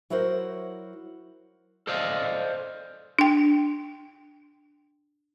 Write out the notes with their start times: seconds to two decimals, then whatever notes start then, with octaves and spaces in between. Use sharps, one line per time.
0.10 F#3 E4 F#4 A#4 C5
1.87 A4 C5 D5 D#5 F5
3.19 D4 G5